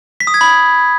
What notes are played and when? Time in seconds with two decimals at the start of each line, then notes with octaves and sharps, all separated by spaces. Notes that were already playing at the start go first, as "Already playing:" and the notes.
0.20 B6
0.27 D#6
0.34 G#6
0.41 B5